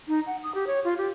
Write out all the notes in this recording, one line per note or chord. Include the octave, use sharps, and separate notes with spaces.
D#4
F#5
D#6
G4
C#5
F4
G4